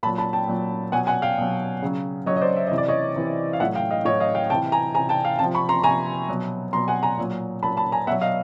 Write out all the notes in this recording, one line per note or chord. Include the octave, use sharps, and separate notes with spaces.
A#2 F#3 A5 B5
A5 B5
G5 A5
A#2 F#3
B2 F#3 F#5 G#5
F#5 G#5
F5 G5
B2 F#3
C#3 F#3
C#3 F#3 C#5 D#5
D#5
C5 D5
E5
C3 E3 D#5
D5
C#5 D#5
C3 E3
F5
A2 F#3 E5 F#5
F5 G5
D#5 F5
A2 F#3 C#5 D#5
D#5 F5
F5 G5
C3 E3 G5 A5
G#5 A#5
C3 E3 G#5 A#5
G5 A5
F5 G5
C3 F3 G5 A5
B5 C#6
A#5 C6
C3 F3 G#5 A#5
B2 F#3
B2 F#3 A#5 C6
F#5 G#5
G#5 A#5
A#2 F#3
A#2 F#3 A5 B5
A5 B5
G#5 A#5
B2 F#3 E5 F#5
D#5 F5